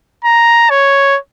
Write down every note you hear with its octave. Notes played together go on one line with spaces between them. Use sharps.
A#5
C#5